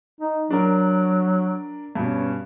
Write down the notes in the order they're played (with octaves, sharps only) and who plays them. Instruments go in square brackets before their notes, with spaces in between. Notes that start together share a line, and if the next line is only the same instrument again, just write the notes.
[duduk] D#4
[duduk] F#3 [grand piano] D4 A#4
[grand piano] G2 B2 [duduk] C#4